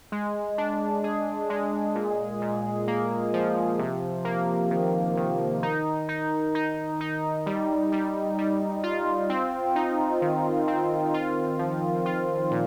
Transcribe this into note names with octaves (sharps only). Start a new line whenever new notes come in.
G#3
D4
G#4
G#3
A#2
A#2
A#3
F3
C3
A#3
D#3
D#3
D#4
D#4
D#4
D#4
G3
G3
G3
F4
C4
D#4
D#3
C4
F4
F3
F4
A#2